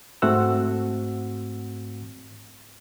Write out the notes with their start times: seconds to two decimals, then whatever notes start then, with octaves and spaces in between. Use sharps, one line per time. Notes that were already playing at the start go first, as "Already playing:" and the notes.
0.22 G#2 A3 C4 F#4 F#5 E6